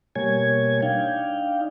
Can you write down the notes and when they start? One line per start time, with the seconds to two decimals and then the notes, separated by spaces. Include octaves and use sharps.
0.15 B2 G3 A#3 C#5 G#5 G#6
0.82 D4 D#4 F5 G5